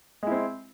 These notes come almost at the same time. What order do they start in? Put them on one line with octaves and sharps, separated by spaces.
G#3 E4 C4